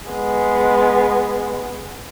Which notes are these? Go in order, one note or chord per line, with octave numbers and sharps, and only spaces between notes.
G#3 B3